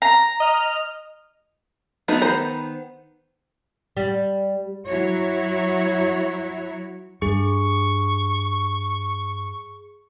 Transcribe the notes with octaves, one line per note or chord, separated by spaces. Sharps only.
A#5
D#5 F6
F3 A3 B3 D#4 F#4
D#3 B3 C5 A#5 B5
G3
F#3 E4 F#4 C#5
G2 G#4 C#6